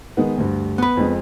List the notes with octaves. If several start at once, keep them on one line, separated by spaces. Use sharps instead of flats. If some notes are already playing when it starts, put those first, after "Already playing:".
D#3 G#3 B3
D2 G2
B3 B4
F2 G#3